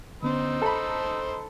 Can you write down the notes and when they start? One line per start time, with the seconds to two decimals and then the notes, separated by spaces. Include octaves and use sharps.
0.23 D3 B3 C#4 D#4 C5 E6
0.62 A4 A#5 B5